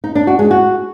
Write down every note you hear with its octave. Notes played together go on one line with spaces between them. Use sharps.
D#4
D4
F#4
G#3
F#4